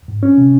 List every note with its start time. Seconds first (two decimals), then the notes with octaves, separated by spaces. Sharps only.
0.08 G#2
0.23 C#4
0.38 C3